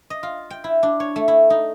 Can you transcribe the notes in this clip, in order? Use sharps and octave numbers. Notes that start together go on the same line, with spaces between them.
D#5
F4
G5
E4
D4
C#5
A3
E4
D#4